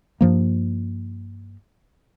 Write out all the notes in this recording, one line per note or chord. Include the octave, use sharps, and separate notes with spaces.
G2 F3 A#3